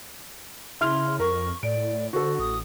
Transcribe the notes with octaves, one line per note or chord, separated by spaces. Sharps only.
C#3 E4 C6 F6
F2 A#4 C#6
A2 D5 D7
D3 F#4 A4 C5
A1 D#6